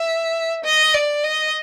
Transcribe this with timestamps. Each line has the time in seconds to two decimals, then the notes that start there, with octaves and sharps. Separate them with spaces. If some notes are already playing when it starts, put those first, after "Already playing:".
Already playing: E5
0.65 D#5
0.94 D5
1.24 D#5